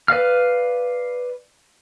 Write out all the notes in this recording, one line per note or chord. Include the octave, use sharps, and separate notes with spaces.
B4 D5 F5 F6